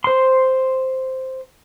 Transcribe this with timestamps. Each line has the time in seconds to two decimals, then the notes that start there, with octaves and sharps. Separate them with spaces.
0.04 C5 C6